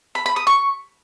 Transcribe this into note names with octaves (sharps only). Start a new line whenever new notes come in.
B5
B5
D#6
C#6